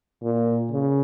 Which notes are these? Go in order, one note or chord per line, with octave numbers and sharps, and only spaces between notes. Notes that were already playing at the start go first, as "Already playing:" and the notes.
A#2
C#3